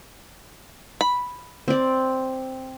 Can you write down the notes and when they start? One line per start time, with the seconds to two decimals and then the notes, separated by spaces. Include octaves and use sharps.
1.01 B5
1.68 C4 D5